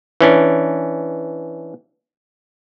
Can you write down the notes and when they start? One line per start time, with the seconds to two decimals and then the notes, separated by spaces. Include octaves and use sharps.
0.21 E3 C#4 D4